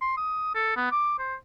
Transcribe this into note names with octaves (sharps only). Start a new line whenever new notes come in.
C6
D#6
A4
B3
D6
C5